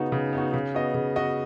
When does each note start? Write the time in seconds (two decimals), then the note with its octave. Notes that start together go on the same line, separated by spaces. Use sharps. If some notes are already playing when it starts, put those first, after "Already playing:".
Already playing: C#3 B3 D#4 F#4
0.12 C#3
0.33 B3 D#4 F#4
0.54 C#3
0.74 B3 F#4 D#5
0.94 C#3
1.16 B3 F#4 D#5